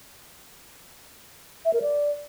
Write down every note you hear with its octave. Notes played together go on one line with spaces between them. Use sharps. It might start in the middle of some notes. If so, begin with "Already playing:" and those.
E5
A#4
D5